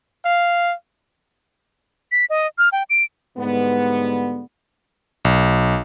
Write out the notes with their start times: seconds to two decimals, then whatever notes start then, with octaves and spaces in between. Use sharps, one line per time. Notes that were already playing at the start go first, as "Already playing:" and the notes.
0.24 F5
2.12 B6
2.30 D#5
2.58 F6
2.72 G5
2.90 D7
3.38 G#2 D3 G3 B3
5.25 B1